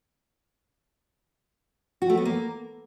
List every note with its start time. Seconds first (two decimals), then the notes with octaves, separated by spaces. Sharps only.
2.02 F#4
2.10 A3
2.18 B3
2.25 A#3